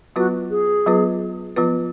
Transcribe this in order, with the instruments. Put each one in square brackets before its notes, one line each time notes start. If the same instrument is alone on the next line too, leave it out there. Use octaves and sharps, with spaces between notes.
[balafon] F#3 B3 F4 B4 [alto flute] F#4
[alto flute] G#4
[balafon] F#3 B3 F4 B4
F3 B3 F4 B4